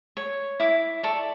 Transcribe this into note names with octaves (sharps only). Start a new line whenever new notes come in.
C#5
E4 D6
A4 D5 C#6